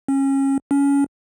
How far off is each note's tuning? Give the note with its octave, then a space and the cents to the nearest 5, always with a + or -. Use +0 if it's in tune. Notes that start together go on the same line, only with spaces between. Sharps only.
C#4 -25
C#4 +20